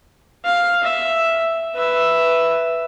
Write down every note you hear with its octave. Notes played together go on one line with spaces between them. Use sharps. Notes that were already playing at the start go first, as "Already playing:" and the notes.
F5
E5
B4 E5